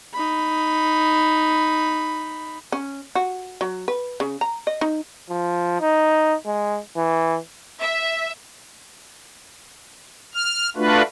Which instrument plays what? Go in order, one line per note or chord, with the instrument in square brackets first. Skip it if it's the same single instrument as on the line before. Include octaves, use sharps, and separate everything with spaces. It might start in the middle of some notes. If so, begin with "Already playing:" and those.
[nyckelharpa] D#4 B5
[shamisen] C#4
F#4
F#3
B4
C#3
A#5
D#5
D#4
[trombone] F3
D#4
G#3
E3
[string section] E5
[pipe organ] F6
A3 D4 F4 F#4 B4